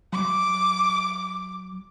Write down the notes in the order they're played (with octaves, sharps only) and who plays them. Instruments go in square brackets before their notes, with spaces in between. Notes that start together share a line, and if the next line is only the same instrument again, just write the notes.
[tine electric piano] F#3 [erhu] D6